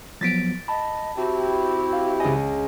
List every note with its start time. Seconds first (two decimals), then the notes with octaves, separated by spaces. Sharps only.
0.21 F3 F#3 B3 A6 B6 D7
0.68 D#5 A5 B5
1.17 C4 E4 F#4 G4
1.93 F5
2.20 C#2 D#5 G#5